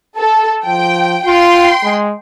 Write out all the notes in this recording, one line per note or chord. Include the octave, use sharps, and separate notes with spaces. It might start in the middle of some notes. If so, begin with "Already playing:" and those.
A4
F3 G5
F4 G5 C6
G#3